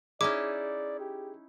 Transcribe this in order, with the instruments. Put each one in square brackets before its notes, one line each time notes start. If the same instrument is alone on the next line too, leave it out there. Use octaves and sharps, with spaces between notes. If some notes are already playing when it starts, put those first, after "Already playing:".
[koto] C#4 D#4 E4 [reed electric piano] G#4 [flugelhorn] D5 [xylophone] D6
[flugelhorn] G4